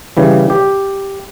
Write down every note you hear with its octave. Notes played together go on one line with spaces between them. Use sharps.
C#3 E3 G3
G4